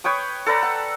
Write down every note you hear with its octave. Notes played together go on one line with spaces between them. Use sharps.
B4 C#5 G5 D#6
A4 B4 D5 A#5
F#5